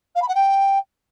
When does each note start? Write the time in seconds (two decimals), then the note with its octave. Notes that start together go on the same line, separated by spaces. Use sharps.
0.15 F5
0.22 B5
0.28 F#5
0.35 G5